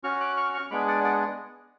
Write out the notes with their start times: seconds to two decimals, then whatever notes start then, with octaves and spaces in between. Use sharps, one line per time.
0.04 C#4 F#4 C#6 F6
0.20 D6 F#6
0.37 C#6 F6
0.54 C#6 F6
0.71 G#3 B3 D4 G#4 B5 D6
0.88 D5 F#5
1.04 D5 F#5